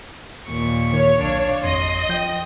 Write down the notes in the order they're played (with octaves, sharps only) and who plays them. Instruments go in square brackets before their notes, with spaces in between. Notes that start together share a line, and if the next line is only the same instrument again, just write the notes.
[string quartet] D#2 A#2 C#6
[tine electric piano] D#3 [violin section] C#5
[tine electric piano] B1 [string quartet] D4 F5
[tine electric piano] G#1 F2 [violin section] D#5 [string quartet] C6
[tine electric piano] F3 G6 [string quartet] G5 D#6